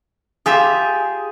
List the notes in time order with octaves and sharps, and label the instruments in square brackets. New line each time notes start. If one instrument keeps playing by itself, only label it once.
[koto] F4 G4 E5 [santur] G#4